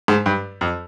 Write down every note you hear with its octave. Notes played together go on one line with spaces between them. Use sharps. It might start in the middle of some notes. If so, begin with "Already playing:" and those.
G#2
G2
F2